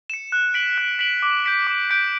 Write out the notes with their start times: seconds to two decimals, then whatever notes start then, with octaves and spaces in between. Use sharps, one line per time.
0.10 C#7 E7
0.32 F#6
0.54 B6 D7 F#7
0.78 F#6
0.99 B6 D7 F#7
1.22 D6
1.45 G6 B6 D7
1.67 D6
1.90 G6 B6 D7